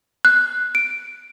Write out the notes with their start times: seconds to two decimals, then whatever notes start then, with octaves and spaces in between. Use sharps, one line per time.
0.25 F#6
0.75 D7